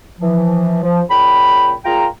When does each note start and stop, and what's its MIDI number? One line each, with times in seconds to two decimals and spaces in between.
0.20 0.78 52
0.20 0.78 53
0.82 1.01 53
1.10 1.72 46
1.10 1.72 49
1.10 1.72 79
1.10 1.72 83
1.85 2.06 46
1.85 2.06 65
1.85 2.06 68
1.85 2.06 79
1.85 2.06 82